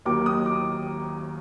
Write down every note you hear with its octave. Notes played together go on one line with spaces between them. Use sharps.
D#2 D#3 F#3 A#3 D6
D#6
D6